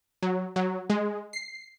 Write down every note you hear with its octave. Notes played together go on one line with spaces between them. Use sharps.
F#3
F#3
G#3
C7